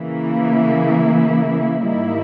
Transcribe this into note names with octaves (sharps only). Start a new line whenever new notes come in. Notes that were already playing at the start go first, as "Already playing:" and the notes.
Already playing: C#3 E3 A#3 E4
G#2 D#3 G3 A#3 E4